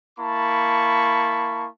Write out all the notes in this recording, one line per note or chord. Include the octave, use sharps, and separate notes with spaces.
A#3 E4 A5 B5 C#6